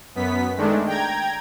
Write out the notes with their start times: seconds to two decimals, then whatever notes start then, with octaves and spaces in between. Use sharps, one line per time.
0.15 F#2 B3 B6
0.57 D#3 G#3 A3 D4
0.87 G5 A#5 G#6